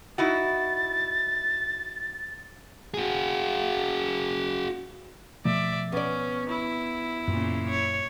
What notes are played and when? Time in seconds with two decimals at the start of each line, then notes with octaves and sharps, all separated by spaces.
0.18 D#4 E4 F#4 A6
2.94 F#4 G#4
5.45 B2 F3 A3 D5 E5
5.92 B3 C#4 D5
6.49 E4
7.28 F#2 A#2 C#3
7.70 C#5